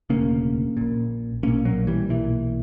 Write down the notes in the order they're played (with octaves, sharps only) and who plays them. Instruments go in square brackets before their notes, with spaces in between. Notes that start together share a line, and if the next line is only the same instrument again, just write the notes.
[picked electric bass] E1 D2 C#3 A#3 C#4
A#1 A#2
B1 A#2 A#3 C#4
F#3 A#3
E3 G3
B1 A#2 E3